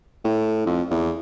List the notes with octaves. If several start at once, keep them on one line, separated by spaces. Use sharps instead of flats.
A2
F2
E2